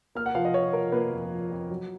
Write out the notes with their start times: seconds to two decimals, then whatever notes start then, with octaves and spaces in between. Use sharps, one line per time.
0.15 A#3 F6
0.26 F#5
0.35 F3 F5
0.45 D#5
0.54 F3 C#5
0.73 F3 A#4
0.92 A#3 B4
1.13 F2
1.31 F3
1.51 F2
1.70 F#3